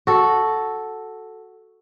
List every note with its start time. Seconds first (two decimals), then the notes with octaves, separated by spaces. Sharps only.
0.07 F#4 A4